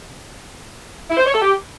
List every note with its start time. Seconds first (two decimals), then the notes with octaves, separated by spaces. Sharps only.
1.09 E4
1.17 C5
1.25 C#5
1.33 A4
1.41 G4